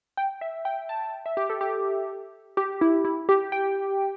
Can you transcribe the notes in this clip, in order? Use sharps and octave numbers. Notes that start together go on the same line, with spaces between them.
G5
E5
G5
A5
E5
G4
A4
G4
G4
E4
E4
G4
G5